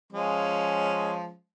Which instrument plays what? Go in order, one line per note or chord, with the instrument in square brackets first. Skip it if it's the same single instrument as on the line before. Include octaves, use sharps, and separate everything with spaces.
[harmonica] F3 G#3 C#4